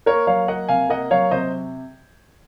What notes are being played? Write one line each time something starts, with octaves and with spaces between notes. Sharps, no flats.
A#3 A#4 C#5
F#3 C#5 F5
A#3 D#5 F#5
C3 F5 G#5
A#3 D#5 F#5
F#3 C#5 F5
C3 C5 D#5